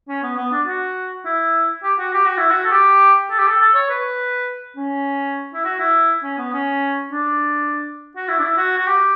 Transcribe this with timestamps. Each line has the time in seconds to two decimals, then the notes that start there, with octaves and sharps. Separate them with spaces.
0.08 C#4
0.23 B3
0.37 B3
0.51 D4
0.67 F#4
1.25 E4
1.83 G4
1.99 F#4
2.14 G4
2.25 F#4
2.37 E4
2.50 F#4
2.64 A4
2.72 G4
3.30 A4
3.39 G4
3.47 A4
3.60 A4
3.74 C#5
3.89 B4
4.77 C#4
5.54 E4
5.65 F#4
5.79 E4
6.23 C#4
6.38 B3
6.53 C#4
7.11 D4
8.16 F#4
8.28 E4
8.39 D4
8.43 E4
8.57 F#4
8.78 F#4
8.87 G4